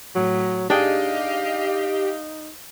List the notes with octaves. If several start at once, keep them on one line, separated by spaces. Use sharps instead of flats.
A2 F#3
D4 D#4 G4 G#4 D#5 F5 G5